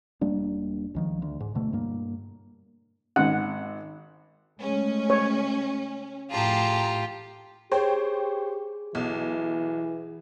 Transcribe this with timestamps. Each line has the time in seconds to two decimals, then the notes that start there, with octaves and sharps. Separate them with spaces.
0.21 E1 G3 A#3 D4
0.95 C#2 D#3 F3
1.22 D2
1.40 G#2
1.55 D2 B2 A3
1.73 G2 A#3
3.16 G#1 G#2 F#5
4.61 C#3 G#3 A3 C#4
5.10 C#5
6.30 A1 F2 A2 F4 G4 G#4 A5 A#5
7.72 G4 G#4 C5 C#5 G5
8.95 B1 E3